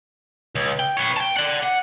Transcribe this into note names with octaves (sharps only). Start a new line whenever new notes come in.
C#2
G5
B4 C#5
G5 A5
D5 F#5
F#5